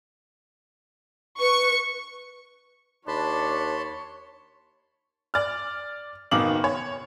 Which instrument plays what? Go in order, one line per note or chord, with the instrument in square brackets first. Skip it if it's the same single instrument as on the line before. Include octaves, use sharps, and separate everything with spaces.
[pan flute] B4 [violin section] C#6
[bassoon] D#2 [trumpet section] D4 [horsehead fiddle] C#5 [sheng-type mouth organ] A5 B5 C6
[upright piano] D5 F6
F#1 B2 D#3 F5 D6 F#7
C#5